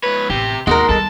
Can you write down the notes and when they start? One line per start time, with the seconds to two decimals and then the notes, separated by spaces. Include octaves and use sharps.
0.03 G#2 B4 C#5
0.30 A1 C3 G4
0.67 D#2 G#3 D#4 F#4 A#4 C6
0.89 D#3 G3 A4 A5